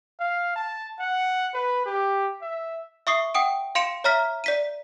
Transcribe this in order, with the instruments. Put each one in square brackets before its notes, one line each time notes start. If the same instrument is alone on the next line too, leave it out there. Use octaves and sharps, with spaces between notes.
[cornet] F5
A5
F#5
B4
G4
E5
[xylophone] E5 C#6 D#6 C7
F#5 G5 D#6 D7
F5 C6 C#7 D7 E7
C#5 E5 A#5 F6 B6
D5 B6 D#7